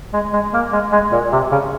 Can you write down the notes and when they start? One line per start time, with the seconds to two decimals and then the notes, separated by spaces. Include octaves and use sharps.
0.13 G#3
0.33 G#3
0.54 A#3
0.73 G#3
0.92 G#3
1.12 A#2
1.32 C3
1.52 C#3